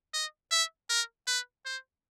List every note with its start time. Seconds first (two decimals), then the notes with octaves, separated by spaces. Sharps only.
0.14 D#5
0.52 E5
0.90 A#4
1.27 B4
1.65 C5